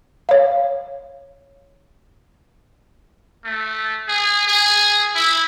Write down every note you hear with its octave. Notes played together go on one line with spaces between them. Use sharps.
C#5 F5
A3
G#4
G#4
E4